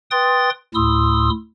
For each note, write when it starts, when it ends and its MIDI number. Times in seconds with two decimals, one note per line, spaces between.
0.11 0.50 71
0.11 0.50 79
0.11 0.50 84
0.11 0.50 87
0.11 0.50 93
0.75 1.30 38
0.75 1.30 45
0.75 1.30 64
0.75 1.30 84
0.75 1.30 87
0.75 1.30 88